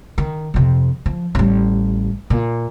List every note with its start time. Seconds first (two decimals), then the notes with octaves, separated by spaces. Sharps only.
0.18 D#3
0.54 F2 C3
1.06 F3
1.35 A1 G3
2.30 A#2